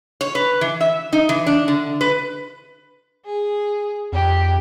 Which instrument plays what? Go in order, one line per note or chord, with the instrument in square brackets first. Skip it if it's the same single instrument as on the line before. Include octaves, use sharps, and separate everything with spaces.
[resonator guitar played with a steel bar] C#5
B4
E3
E5
D#4
E3
D4
D3
B4
[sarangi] G#4
[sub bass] F2 [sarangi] G4